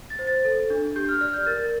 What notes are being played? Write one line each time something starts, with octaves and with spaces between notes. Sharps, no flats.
A6
C5
A6
A4
D4
G4 G6
F6
D5 F6
G6
A#4 A6